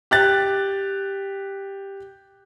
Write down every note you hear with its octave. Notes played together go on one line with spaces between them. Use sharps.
G4 F#6 A6